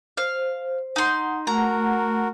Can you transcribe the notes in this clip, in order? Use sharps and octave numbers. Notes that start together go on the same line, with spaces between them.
C5 F5
D#4 F#5 C6
A3 F#4 A#4 F#5 A#5